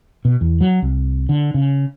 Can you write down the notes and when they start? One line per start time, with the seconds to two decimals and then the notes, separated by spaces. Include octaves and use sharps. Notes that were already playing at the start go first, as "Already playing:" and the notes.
0.25 B2
0.41 E2
0.61 F#3
0.82 C2
1.29 D3
1.54 C#3